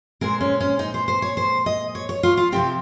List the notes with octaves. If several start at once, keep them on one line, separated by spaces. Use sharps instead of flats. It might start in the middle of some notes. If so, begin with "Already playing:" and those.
A#2 G#3 C4 A#4
C#4
C#4
D#4
C5
C5
C#5
C5
D#5
C#5
C#5
F4
F4
C3 F3 C4 G4